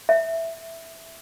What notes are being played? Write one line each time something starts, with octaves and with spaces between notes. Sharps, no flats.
E5